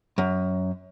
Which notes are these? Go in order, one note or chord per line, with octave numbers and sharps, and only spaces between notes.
F#2